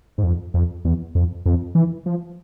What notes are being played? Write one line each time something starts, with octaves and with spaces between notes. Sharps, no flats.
G#2
F2
F2
E2
F2
F2
E3
F3